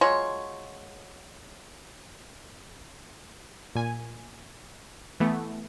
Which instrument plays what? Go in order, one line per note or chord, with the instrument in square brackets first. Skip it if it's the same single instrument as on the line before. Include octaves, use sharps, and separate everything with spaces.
[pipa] F#3 G#3 F4 C#5
[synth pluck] A#2 G#5
E3 A3 B3